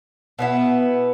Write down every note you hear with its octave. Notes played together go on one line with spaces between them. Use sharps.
B2 B3 E4